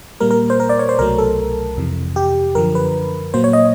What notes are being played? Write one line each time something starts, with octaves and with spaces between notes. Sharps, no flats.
A#2 G3 A#3 A#4
A#4
C5
A#4
D5
C#5
C5
C2 B2 F#3 A3 A#4
A4
F2 C3 E3
G4
F#2 D3 F3 A#4
B4
A#2 F#3 A#3 C5
C#5
D#5